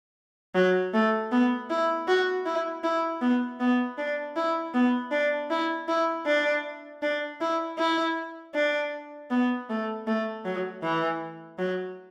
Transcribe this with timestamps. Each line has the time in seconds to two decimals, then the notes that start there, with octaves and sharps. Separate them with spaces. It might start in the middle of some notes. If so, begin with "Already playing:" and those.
0.55 F#3
0.94 A3
1.32 B3
1.70 E4
2.08 F#4
2.46 E4
2.84 E4
3.21 B3
3.60 B3
3.98 D4
4.37 E4
4.75 B3
5.12 D4
5.50 E4
5.88 E4
6.26 D4
7.03 D4
7.41 E4
7.79 E4
8.55 D4
9.31 B3
9.70 A3
10.07 A3
10.46 F#3
10.83 E3
11.59 F#3